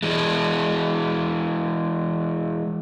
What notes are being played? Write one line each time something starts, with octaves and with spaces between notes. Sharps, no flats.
E3 G#3